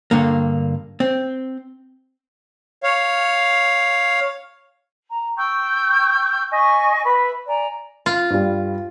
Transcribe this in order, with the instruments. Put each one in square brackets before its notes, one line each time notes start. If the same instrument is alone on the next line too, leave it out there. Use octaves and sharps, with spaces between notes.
[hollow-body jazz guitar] G2 D3 A#3
C4
[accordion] C#5 F5
[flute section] A#5
G5 C#6 E6 G6
D#5 E5 G#5 C#6
B4 E5 B5
D5 G#5 A#5
[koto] F4
[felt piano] G2 G3